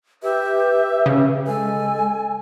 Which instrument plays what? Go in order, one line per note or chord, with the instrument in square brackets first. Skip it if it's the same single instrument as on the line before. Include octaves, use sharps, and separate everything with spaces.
[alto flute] G4 [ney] B4 [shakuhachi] E5
[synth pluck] C#3
[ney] G#3 [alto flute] A4 [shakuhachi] G#5